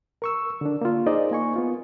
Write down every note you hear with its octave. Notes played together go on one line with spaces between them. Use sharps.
A#4 C#6 E6
D3 D4
A#3 F4
D#4 G#4 C5 D5 D#5
A#3 G#5 C#6
B3 F4